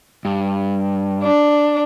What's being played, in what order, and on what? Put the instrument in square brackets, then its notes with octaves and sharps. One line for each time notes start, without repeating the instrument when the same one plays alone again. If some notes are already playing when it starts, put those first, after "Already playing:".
[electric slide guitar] G2
[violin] D4